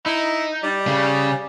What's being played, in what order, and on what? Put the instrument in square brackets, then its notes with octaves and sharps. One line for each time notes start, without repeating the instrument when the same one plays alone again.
[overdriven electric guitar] D#4 [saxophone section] E4
[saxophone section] G3
[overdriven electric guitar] C#3